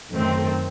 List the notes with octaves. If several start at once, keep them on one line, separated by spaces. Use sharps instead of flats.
F#2 D#3 A3 C4